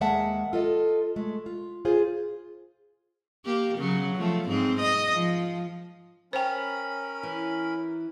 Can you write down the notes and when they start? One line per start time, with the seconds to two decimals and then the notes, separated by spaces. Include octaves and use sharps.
0.01 D#2 G#3 A#3 E5 F#5 A5
0.53 F4 A4 D#5
1.16 G#3 A3
1.46 F4
1.85 F4 G#4 C5
3.45 A#3 G4
3.78 C#3 F#3
4.16 F3 A3
4.48 G#2 C4
4.80 D#5
5.13 F3
6.33 C#4 A#4 C5 G5 B5
7.23 E3